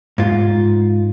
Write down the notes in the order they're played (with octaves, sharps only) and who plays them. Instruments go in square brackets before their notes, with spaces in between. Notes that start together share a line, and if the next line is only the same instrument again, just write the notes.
[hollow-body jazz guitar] G#2 F4